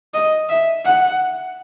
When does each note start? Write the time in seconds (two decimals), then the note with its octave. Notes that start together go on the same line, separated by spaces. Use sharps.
0.14 D#5
0.49 E5
0.85 F#5